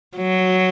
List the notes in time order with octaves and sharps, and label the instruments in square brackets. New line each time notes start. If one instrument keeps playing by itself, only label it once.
[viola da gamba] F#3